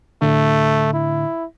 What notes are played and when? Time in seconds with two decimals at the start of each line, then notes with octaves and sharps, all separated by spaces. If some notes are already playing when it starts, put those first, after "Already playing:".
0.22 A2 D3 A3
0.94 E4